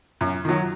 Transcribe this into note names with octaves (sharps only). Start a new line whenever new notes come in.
F#2
D#3 F#3